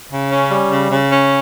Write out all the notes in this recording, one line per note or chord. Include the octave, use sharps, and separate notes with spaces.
C#3
C#4
G3
C#3
C#3
C#4